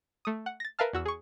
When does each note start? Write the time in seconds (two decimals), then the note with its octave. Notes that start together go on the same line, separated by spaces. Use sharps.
0.25 A3 D#6
0.46 F#5
0.60 A6 A#6
0.79 A#4 B4 E5 F5 A5 F6
0.93 E2 F#4 E6
1.06 G#4 C#6